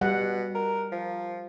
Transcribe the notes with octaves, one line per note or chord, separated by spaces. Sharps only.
B2 G3 F#5
A#4
F3